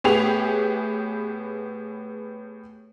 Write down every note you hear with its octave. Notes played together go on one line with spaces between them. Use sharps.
A2 B3 G4 G#4 F7